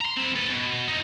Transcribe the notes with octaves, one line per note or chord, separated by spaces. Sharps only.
A#5 C6
C4 E4
A4 B4
B2
D#4 E4